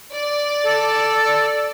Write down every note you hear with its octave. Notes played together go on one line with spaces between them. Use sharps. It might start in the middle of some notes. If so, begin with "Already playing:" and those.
D5
A4